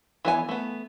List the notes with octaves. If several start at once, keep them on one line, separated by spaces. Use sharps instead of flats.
E3 B3 G#5
A3 B3